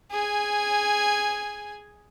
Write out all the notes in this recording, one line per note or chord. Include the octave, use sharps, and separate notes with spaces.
G#4 G#5